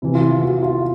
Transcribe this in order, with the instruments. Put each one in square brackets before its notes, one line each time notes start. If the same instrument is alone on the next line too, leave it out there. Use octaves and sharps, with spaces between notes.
[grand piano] C3 E3 E4
F4
E4
F#4
F4